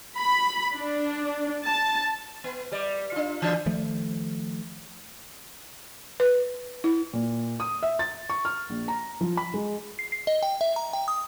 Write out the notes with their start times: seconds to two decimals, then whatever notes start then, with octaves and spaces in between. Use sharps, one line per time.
0.19 B5
0.76 D4
1.65 A5
2.44 B3
2.72 G3 D5
3.12 D4 F4
3.42 E3 D4
3.66 D#3 F3 A3
6.20 B4
6.84 E4
7.13 A#2
7.60 D#6
7.83 E5
7.99 A6
8.30 C#6
8.45 F6
8.70 A#1
8.88 A#5
9.21 F3
9.37 B5
9.54 G#3
9.99 C7
10.12 C7
10.27 D#5
10.43 G5
10.61 E5
10.76 A#5
10.93 G5
11.08 D#6